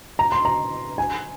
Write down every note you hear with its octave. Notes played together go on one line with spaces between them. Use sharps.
A#5
C6
A#5
G#5